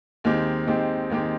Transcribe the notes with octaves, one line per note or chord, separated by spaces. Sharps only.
D#2 D#3 G#3 C4 G4
D#2 D#3 G#3 C4 G4
D#2 D#3 G#3 C4 G4